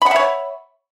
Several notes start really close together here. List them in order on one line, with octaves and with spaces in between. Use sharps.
B5 F#5 E5 C#5